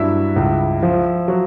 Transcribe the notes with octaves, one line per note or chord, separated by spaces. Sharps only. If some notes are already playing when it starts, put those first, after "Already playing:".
Already playing: G2 F#3 E4 E5
C#2
F3
F#3